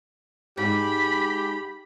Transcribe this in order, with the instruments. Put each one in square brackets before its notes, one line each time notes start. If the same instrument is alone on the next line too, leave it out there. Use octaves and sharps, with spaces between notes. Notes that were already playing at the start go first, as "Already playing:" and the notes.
[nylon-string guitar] G#2 [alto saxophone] G4 [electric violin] B5